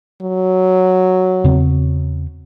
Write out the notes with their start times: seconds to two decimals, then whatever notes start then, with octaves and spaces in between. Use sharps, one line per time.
0.22 F#3
1.44 E2 C#3 C4